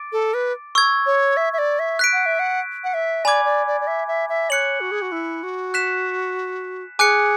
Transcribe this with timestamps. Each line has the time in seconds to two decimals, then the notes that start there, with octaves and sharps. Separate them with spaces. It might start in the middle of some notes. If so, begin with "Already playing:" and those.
Already playing: D6 A6 D7
0.12 A4
0.34 B4
0.75 C#6 E6 G#6
1.06 C#5
1.37 E5
1.53 E5
1.58 D5
1.79 E5
1.99 F#6 B6 D7
2.13 F#5
2.26 E5
2.39 F#5
2.84 F#5
2.94 E5
3.24 D5 G#5 B5 D6 G#6
3.45 D5
3.67 D5
3.81 D5
3.87 E5
4.08 E5
4.29 E5
4.50 C#5 F#6 C#7 F#7
4.80 F#4
4.91 G#4
5.02 F#4
5.12 E4
5.43 F#4
5.74 F#6 B6 E7
6.99 G#4 G#5 D6 F#6 C#7